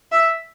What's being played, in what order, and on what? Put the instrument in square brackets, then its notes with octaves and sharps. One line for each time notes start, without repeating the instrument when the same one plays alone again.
[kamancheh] E5